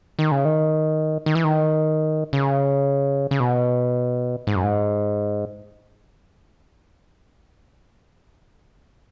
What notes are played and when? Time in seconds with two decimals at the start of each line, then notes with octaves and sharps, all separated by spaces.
0.19 D#3
0.32 C#3
0.45 D#3
1.26 D#3
1.35 E3
1.44 D#3
2.33 C#3
3.31 C#3
3.40 B2
4.47 G#2
4.56 F#2
4.64 G#2